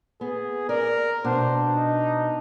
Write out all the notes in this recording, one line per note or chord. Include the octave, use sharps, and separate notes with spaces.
B3 G#4
A#4 D5
B2 D4 C5
D#4